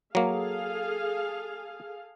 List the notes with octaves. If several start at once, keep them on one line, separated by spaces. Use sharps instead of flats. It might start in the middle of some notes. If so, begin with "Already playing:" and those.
F#3 A#3 G#4 A4 F5